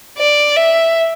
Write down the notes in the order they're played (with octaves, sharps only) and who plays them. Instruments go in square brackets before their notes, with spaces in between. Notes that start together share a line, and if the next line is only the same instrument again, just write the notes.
[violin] D5
E5